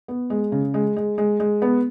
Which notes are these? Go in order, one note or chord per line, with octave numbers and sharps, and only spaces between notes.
B3
G#3
C#3
G#3
G#3
G#3
G#3
B3